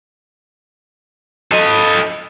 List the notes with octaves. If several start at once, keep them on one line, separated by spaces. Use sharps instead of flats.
A4 D#5